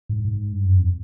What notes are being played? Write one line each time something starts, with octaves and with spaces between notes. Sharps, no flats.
G#2
G#2
G2
F#2
F2